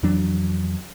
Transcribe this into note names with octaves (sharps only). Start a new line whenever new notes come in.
F2 E3 F#3 D4